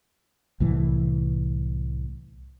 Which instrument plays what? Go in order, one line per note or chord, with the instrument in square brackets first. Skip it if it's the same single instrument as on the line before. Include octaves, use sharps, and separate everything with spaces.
[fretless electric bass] C2 A2 E3